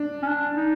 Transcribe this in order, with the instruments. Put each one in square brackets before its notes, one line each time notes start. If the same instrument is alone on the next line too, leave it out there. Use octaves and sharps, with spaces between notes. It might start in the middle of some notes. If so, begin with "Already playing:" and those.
Already playing: [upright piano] D4
[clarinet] C#4
D4
D#4